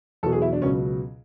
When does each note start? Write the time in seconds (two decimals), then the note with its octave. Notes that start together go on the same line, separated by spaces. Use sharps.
0.23 E2 B2 F#3 A4
0.32 G#4
0.42 E4
0.53 D4
0.62 C#2 B2 F#3 C#4